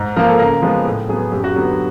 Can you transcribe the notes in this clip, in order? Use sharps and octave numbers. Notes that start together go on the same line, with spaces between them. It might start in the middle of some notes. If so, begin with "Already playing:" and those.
Already playing: G#2
F3 A#3 A#4
A4
C#3 A#4
F3 G#3 B3
A2
F#3 B3 G#4
F#2 G4
F#4
D3 F#3 B3 G4